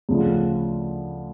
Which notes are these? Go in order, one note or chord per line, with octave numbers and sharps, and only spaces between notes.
D2 C#3 F3